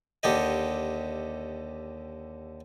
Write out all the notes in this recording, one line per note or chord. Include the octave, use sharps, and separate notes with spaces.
D#2 D3 G4 D#5